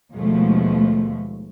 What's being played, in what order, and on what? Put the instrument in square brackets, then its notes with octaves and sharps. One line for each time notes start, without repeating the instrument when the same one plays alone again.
[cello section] D#2 B2 F3 G#3 A3